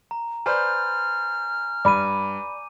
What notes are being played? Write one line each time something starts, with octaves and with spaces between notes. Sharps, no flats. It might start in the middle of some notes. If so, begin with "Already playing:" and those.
A#5
B4 C5 D5 G#5 F6 G6
G2 D5 B5 D6 D#7